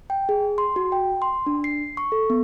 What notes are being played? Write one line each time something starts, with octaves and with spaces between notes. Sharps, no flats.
G5
G#4
C6
F#4
G5
C6
D4
C7
C#6
A4
B3